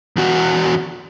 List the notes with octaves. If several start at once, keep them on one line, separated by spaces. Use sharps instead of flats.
E2 F#4